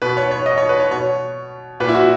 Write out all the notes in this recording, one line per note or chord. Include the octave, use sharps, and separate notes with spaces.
B2 B4
C#5
C#5
D#5
C#5
B4
C#5
B2 C#5
A#2 B4
E4
F#4